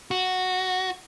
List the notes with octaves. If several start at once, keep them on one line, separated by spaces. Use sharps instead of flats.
F#4